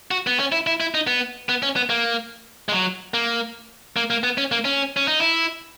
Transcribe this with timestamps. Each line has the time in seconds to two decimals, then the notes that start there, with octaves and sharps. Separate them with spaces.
0.11 F#4
0.27 B3
0.40 C#4
0.52 E4
0.67 E4
0.80 E4
0.94 D#4
1.07 B3
1.49 B3
1.63 C#4
1.76 B3
1.90 A#3
2.69 G#3
2.73 F#3
3.14 A#3
3.96 A#3
4.10 A#3
4.23 B3
4.38 C#4
4.52 A#3
4.65 C#4
4.97 C#4
5.08 D#4
5.20 E4